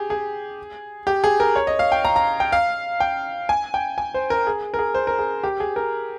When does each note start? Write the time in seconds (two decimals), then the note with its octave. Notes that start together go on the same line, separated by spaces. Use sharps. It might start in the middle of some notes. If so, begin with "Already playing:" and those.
Already playing: G4 G#4
0.10 G#4
1.07 G4
1.24 G#4
1.40 A#4
1.56 C#5
1.67 D#5
1.79 F5
1.92 G5
2.05 A#5
2.16 A#5
2.40 G5
2.52 F5
3.00 G5
3.49 G#5
3.74 G5
3.98 G#5
4.14 C5
4.30 A#4
4.47 G#4
4.74 A#4
4.79 G#4
4.95 C5
5.07 A#4
5.19 G#4
5.44 G4
5.60 G#4
5.76 A#4